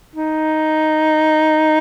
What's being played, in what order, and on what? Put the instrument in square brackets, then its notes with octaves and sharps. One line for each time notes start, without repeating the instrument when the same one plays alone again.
[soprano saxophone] D#4